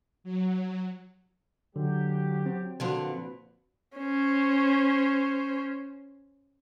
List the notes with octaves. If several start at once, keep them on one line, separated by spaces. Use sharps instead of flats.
F#3
D3 F#3 G4
C4
A#2 D3 F3 F#3 B4
C#4 C5